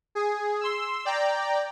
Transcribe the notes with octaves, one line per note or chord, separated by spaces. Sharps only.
G#4
C6 E6
D5 G5 A#5